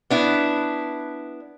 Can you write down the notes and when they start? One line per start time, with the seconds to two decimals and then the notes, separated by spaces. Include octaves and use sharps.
0.10 B3 D4 E4